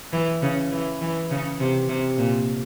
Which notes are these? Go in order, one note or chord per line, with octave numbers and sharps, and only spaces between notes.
E3
C#3
E3
E3
C#3
C3
C3
A#2